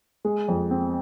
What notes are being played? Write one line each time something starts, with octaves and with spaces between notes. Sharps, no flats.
G#3
F2
C4